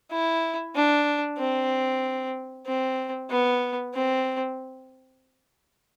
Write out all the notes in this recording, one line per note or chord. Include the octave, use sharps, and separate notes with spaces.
E4
D4
C4
C4
B3
C4